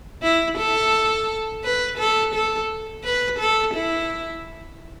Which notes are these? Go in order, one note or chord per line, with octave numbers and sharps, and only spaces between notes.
E4
A4
B4
A4
A4
B4
A4
E4